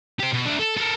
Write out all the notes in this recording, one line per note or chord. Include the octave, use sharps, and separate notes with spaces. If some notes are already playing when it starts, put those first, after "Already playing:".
G4 C5
B2
D4 E5
A4
A4 A#4